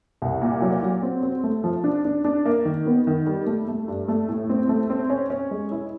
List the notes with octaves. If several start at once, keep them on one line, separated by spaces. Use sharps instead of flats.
C2
A#2
F#3
F#3
C4
C4
A3
F3
D4
D4
D4
A#3
D#3
B3
D#3
G3
A3
A3
G2
A3
A2
C4
A3
C4
C#4
C#4
G#3
E4